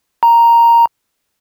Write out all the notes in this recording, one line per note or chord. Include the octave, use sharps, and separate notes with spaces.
A#5